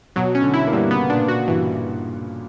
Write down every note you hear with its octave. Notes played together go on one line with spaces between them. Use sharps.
B2 F#3
C#4
D3
E4
A#3
G2 B3
A#3
C#3 B3
A#2 D4
B2 F#4
G2 E3